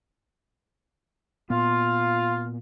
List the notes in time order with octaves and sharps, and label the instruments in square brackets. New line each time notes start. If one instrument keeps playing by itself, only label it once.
[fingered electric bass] A#2 B3 [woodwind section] F4